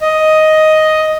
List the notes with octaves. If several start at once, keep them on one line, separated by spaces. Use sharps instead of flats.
D#5